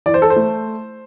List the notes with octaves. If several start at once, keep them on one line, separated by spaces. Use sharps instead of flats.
E3 D5
C5
A4
C5
A3